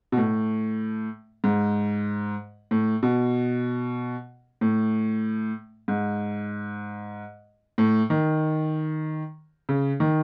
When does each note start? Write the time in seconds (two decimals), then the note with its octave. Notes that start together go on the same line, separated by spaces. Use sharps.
0.12 B2
0.17 A2
1.44 G#2
2.71 A2
3.03 B2
4.61 A2
5.88 G#2
7.78 A2
8.10 D#3
9.69 C#3
10.00 D#3